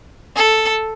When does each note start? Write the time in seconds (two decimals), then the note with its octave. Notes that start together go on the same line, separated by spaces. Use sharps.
0.36 A4